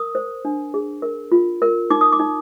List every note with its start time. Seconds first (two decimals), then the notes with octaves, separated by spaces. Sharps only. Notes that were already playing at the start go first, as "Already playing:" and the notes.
Already playing: A#4 D#6
0.15 C5
0.45 D4
0.74 G#4
1.02 A#4
1.32 F4
1.62 A#4
1.90 D#4 D6
2.01 D#6
2.12 D6
2.20 D#4